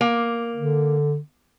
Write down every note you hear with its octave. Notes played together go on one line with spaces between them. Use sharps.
A#3
D3